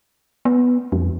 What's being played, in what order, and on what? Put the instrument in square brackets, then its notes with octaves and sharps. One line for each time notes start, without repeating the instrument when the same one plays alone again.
[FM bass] B3
F2